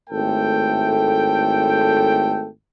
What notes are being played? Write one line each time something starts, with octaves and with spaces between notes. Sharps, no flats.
G#1 A2 A3 A4 G5